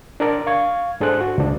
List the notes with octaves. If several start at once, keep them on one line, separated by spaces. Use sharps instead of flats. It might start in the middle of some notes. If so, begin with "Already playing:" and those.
D4 A#4 D5
F5 C#6 G#6
G#2 D4 G#4 A4 C5 F#6
F#4
C#2 D4